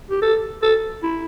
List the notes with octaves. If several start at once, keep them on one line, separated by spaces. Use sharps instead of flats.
G4
A4
A4
E4